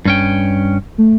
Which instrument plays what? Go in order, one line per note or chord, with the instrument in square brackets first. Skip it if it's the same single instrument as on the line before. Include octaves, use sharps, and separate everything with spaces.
[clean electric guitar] G2 C#4 G5
[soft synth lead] A3